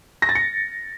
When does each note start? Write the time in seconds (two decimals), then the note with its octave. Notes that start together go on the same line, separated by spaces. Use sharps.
0.22 A#6
0.29 A6
0.35 C#7